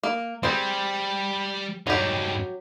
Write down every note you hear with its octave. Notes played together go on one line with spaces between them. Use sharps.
A#3
G3 C4 G#4 C5
G2 F#3 D#4 G4